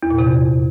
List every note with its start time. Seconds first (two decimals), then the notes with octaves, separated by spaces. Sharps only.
0.03 E2
0.11 A#2
0.19 C3
0.26 F2